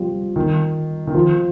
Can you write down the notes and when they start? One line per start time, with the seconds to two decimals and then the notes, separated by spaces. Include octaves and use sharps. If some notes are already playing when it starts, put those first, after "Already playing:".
Already playing: F3 G3
0.36 D#3
1.07 D#3
1.14 F3